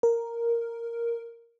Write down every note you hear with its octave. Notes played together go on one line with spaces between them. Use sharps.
A#4